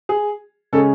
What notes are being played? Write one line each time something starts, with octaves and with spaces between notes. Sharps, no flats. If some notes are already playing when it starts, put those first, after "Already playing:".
G#4
C#3 G#3 C#4 A4